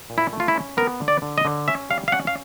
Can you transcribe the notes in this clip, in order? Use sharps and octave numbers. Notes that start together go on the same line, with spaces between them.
A#2
E4
A3
F4
E4
C#4
B3 A#4
D3
D5
D3
D#5
D3
C#4 E5
G3 F5
F5
C#4 F#5
F5